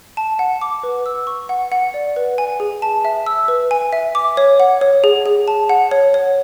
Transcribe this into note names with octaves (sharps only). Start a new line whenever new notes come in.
A5
F#5
D6
B4
E6
C#6
F#5
F#5
D5
B4
G#5
G#4
A5
E5
E6
B4
G#5
E5
D6
C#5
F#5
C#5
G#4
G#4
A5
F#5
C#5
C#5